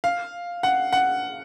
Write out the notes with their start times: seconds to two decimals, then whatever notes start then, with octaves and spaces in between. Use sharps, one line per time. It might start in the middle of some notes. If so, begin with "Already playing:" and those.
0.04 F5
0.63 F#5
0.93 F#5